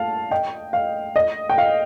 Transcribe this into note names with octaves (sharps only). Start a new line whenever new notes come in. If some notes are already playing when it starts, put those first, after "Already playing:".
Already playing: F5 A5
D#5 G5
F5
D#5
G5
F5